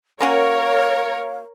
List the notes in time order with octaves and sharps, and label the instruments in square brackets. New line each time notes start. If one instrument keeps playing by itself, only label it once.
[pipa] A#3 C#4 F#4 [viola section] A#4 C#5 [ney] F5